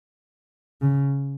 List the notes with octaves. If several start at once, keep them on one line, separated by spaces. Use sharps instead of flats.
C#3